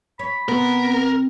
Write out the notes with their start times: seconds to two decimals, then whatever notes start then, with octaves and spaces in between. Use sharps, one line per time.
0.19 C#5 B5
0.49 C3 B3 A#4